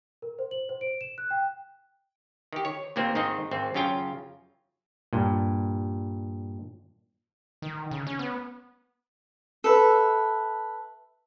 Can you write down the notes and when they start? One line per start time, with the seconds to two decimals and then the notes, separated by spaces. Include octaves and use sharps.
0.22 A#4
0.39 C5
0.51 F#7
0.69 C5
0.81 D7
1.01 E7
1.18 F#6
1.31 G5
2.53 D#3 G4
2.65 C#5
2.96 D#2 A#2 A#3 C4
3.15 G#2 D#3 C4 D#4 D#5
3.51 G#1 C4
3.74 F#2 C#3 C#4 F4 G5
5.13 G2 A#2
7.62 D#3
7.91 C#3
8.07 C#4
8.19 B3
9.64 A4 B4 E5